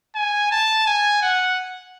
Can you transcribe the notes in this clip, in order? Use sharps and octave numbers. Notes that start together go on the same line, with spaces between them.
G#5
A5
G#5
F#5